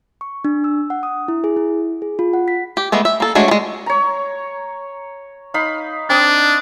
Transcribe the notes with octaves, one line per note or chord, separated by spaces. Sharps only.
C#6
D4
E6
F#5
D#6
E4
G#4
E4
G#4
F4
F#5
B6
G4
G#3 A3 B3
E5
A#3 A4
G#3 A3 D4 F#4 C#5
G#3 A3
C#5 A#5
D#4 F5 B5
C4 D4 D#6